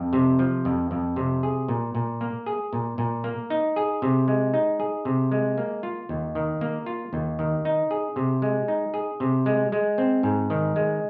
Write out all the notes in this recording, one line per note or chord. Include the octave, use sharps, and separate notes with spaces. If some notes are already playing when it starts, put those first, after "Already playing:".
Already playing: F2
C3
F3
F2
F2
C3
G#4
A#2
A#2
A#3
G#4
A#2
A#2
A#3
D#4
G#4
C3
G#3
D#4
G#4
C3
G#3
A#3
F4
D#2
D#3
A#3
F4
D#2
D#3
D#4
G#4
C3
G#3
D#4
G#4
C3
G#3
G#3
C4
G#2
D#3
G#3